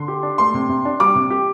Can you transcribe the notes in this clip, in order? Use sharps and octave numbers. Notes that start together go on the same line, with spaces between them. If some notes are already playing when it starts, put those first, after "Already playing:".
Already playing: D3 C6
G4
D4
A3 C6
C3
C3
D4
G3 D6
C3
G4